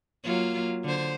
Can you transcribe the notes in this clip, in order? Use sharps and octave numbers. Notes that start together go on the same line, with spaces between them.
F#3 A#3 F4
D3 C5